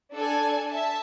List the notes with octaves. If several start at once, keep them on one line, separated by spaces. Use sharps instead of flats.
D4 A4 D5 G#5
E5 A5